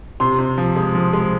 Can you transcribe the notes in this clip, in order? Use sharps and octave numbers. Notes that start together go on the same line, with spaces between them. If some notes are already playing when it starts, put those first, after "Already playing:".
C3 C6
C3
F3
G#3
F3
G#3